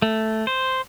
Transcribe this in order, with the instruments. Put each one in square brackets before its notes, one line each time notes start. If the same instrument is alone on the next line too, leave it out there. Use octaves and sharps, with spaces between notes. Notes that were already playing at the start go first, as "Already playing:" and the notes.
[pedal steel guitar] A3
C5